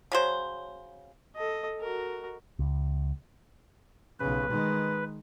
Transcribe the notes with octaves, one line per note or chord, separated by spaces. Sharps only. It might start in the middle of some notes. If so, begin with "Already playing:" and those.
C#3 F#3 C5
A4 D#5
F#4 A#4
C#2
B1 C#3 B4
D#3 G#3